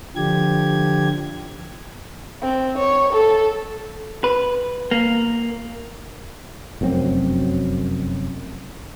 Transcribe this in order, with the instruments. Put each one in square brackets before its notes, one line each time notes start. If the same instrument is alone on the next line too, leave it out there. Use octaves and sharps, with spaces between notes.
[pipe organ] D3 F3 G4 G#6
[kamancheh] C4
C#5
A4
[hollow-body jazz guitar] B4
A#3
[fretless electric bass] F1 F#2 F#3 C4